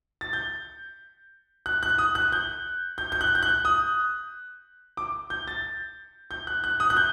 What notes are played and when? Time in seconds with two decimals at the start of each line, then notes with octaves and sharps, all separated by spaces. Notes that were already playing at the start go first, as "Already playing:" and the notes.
0.21 A6
0.33 G6
1.66 F#6
1.83 F#6
1.98 D#6
2.15 F#6
2.32 G6
2.98 G6
3.12 G6
3.21 F#6
3.35 G6
3.43 F#6
3.65 D#6
4.97 D6
5.30 G6
5.48 A6
6.31 G6
6.47 F#6
6.64 F#6
6.80 D#6
6.90 F#6
6.97 G6